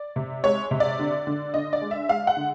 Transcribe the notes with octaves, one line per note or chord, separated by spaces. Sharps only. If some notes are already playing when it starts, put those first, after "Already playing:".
Already playing: D5
C3
G#3 C#5
C3
D5
D3
D3
D3 D#5
D5
G#3
E5
G#3 F5
F#5
D3